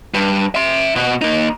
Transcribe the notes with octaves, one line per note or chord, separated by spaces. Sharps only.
G2
E5 C6
B2 F#4
A#3 D#4